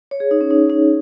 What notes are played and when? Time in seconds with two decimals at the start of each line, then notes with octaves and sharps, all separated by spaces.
0.11 C#5
0.20 G#4
0.31 D#4
0.41 C#4
0.50 D#4
0.70 D#4